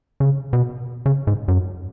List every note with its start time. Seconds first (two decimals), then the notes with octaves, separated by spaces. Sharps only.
0.20 C#3
0.53 B2
1.06 C#3
1.27 G#2
1.48 F#2